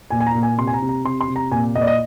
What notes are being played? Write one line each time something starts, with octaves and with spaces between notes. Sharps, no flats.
A#2 G#5
G#5
A#5
A#2
G#5
C3 C6
G#5
A#5
C3
A#5
C3 C6
C6
C3
A#5
A#2 G#5
A#2 D#5
D5
D#5